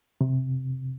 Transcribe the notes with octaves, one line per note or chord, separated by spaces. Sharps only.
C3